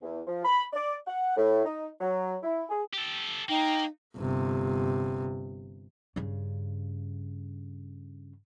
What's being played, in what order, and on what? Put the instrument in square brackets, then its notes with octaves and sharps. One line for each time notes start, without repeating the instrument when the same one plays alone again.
[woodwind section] E2
F3
B5
D5
F#5
A2
D#4
F#3
E4
G#4
[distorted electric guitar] G4 A4
[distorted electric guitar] A#3 [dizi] D#4 [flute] G5
[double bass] G1 C3
[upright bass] G2 C#3